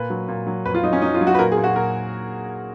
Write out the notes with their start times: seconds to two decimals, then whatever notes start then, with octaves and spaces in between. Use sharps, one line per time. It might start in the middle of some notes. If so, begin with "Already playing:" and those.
Already playing: A#2 B4
0.10 F#3
0.28 A#2
0.47 F#3
0.65 F2 B4
0.75 F4
0.83 F#3 D#4
0.93 C#4
1.02 F#3 D#4
1.14 F4
1.21 F#3
1.27 F#4
1.35 B4
1.39 A#2 A#4
1.52 G#4
1.57 A#2
1.64 F#4
1.76 A#2 A#4